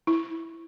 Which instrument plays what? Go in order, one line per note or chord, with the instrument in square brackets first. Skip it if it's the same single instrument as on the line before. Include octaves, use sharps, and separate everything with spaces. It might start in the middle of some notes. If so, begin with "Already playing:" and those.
[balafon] E4